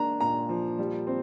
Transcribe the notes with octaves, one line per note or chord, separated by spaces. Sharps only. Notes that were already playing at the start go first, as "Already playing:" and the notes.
Already playing: A#3 D4 A#5
A#2 A#5
F3
G3
C4